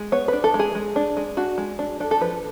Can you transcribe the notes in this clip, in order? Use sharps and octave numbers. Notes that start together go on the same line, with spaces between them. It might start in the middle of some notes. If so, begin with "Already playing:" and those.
Already playing: G#3
B3 C#5
D4 B4
A4
G#3
G#4
G#3
D4
G#3
D4 F#4
G#3
D4
D4 A4
A4
F3 B4